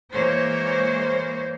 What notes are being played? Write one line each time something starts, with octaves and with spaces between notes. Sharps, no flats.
E3 G#3 A#3 C5 C#5